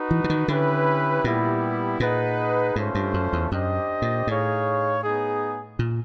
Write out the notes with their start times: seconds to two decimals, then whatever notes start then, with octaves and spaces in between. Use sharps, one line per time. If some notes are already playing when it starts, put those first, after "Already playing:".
Already playing: D#4 F#4 B4
0.11 E3
0.24 E3
0.30 D#3
0.48 D3 C#4 E4 G4 B4
1.24 A#2 G3 B3 E4 G4
2.00 A#2 D#4 G#4 B4 D#5 F#5
2.75 G#2 A3 C#4 F4 A4 C5
2.95 G2
3.14 F#2
3.33 E2
3.52 F#2 D4 G4 C5 D#5
4.02 A#2
4.27 A2 D#4 G#4 C#5 F5
5.03 B3 D#4 G#4
5.79 A#2